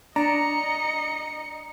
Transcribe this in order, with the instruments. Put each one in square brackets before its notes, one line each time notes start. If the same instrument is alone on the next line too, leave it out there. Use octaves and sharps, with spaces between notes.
[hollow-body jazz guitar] D4 [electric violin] D#5 C#7 [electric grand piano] A#5